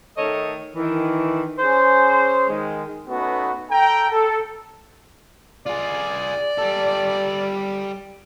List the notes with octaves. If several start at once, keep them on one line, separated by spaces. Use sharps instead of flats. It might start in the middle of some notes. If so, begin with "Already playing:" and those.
D#3 A3 A4 C#5 D#5
D#3 E3
C#4 G#4 C5
D#3 G#3
A3 B3 C#4 D#4 F#4 B4
A4 G5 A#5
A4
F4 G#4 D5
G3 A4